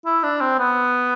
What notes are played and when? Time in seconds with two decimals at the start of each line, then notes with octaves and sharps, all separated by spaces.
0.06 E4
0.24 D4
0.41 C4
0.59 B3